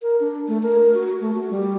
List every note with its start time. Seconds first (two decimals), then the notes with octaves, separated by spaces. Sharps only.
0.02 A#4
0.20 D4
0.48 A3
0.62 A#4
0.94 F#4
1.21 A3
1.34 F#4
1.51 G3